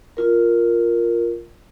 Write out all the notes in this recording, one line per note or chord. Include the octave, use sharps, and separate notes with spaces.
F4 A#4